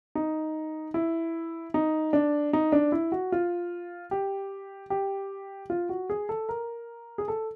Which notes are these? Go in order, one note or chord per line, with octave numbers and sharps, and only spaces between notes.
D#4
E4
D#4
D4
D#4
D4
E4
F#4
F4
G4
G4
F4
F#4
G#4
A4
A#4
G#4
A4